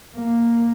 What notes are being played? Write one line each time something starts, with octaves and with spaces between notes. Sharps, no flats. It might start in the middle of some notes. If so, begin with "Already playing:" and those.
A#3